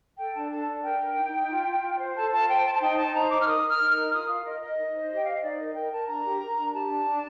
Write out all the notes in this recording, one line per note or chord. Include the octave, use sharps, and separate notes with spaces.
A4 G5
D4 A5
A4 A5
D4
A#4 G5
A#4
D#4
D#4
F4
F4
F4
C5
A4 A5
F4 A5
C5 G5
C5 A5
A5
D#4 G5
D#4 A5
C5 A#5
D#4 D6
F6
A#4 D#6
A#4
F6
D#4
F6
A#4
F4 D#6
F4 F5
A#4 D#5
A#4 D#5
D#4
C5
G4
G5
C5 F5
D#5
D#4 D5
A#4 D#5
A#4 G5
A#4 A5
D4 A#5
G4
A#4
D4
G4 A5
D4
D4